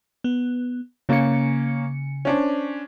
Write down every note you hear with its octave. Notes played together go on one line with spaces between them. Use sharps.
B3
C#3 A#3 C#4 C#7
C#4 D4 C5